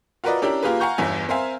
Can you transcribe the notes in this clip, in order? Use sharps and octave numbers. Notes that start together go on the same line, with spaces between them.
F4 F#4 A#4 B4 D5 D#5
C#4 D4 E4 G4 A#4
A#3 F4 G4 G#4 A#4 B4
F5 F#5 G#5 A#5 C#6 G6
G1 E2 G2 E4 G#5
C4 A#4 C5 E5 F5 G#5